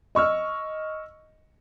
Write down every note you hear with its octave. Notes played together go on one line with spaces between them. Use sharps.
D#5 C#6 E6 F6